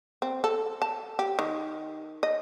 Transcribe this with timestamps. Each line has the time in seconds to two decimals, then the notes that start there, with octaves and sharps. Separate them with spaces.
0.22 C4
0.44 A4
0.82 A5
1.19 G4
1.39 D#3
2.23 D#5